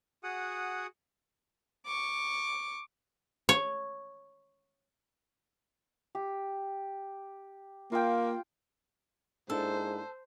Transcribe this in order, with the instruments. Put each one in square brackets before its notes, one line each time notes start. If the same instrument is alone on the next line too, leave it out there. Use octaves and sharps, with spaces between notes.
[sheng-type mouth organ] F#4 G#4 F#5 D#6
[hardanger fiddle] C#6 D6
[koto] C#5
[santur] G4
[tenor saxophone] A#3 [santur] F4 G5
[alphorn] G#2 [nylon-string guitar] A#3 D4 E4 [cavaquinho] A4 [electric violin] C5